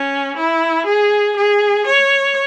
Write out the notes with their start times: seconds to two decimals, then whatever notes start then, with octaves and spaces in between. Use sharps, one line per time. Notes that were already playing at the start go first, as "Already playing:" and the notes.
Already playing: C#4
0.37 E4
0.86 G#4
1.36 G#4
1.86 C#5